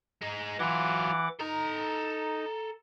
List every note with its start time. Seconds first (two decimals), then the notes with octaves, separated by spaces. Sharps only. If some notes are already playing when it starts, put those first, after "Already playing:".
0.22 G#3 D#4
0.59 E3 F#3 F4 F#5 D6
1.40 D#4 A4 A#5